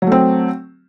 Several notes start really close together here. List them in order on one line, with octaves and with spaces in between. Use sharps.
F#3 A3 C4